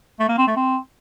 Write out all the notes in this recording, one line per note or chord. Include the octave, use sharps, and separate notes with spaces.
A3
A#3
C4
A3
C4